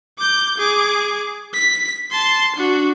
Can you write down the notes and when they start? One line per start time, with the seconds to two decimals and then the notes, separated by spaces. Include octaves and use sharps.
0.18 D6 G6
0.58 G#4 D6
1.54 B6
2.11 A5 C6
2.56 D4 F#4